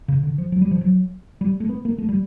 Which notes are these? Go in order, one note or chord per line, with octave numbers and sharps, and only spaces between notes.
C#3
D3
F3
F#3
G3
F3
F#3
G3
A3
B3
A#3
A3
G3